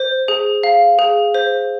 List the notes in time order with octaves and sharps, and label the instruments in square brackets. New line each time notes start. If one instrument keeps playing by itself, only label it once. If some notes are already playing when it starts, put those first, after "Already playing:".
Already playing: [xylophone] C5
G#4
F5
G#4
C5